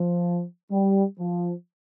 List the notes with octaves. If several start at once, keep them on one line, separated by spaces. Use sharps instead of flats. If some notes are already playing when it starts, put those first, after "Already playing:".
Already playing: F3
G3
F3